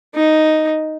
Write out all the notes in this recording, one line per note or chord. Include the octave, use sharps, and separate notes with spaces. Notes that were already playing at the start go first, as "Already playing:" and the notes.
D#4